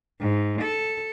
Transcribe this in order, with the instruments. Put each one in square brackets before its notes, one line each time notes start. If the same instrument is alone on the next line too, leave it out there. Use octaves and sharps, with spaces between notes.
[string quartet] G#2
A4